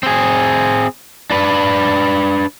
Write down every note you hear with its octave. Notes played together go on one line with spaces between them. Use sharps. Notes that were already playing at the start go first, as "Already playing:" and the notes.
C4 G#4
D4 B4